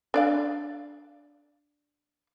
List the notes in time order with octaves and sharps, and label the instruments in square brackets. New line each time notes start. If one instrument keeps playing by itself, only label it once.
[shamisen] D4 D5 F5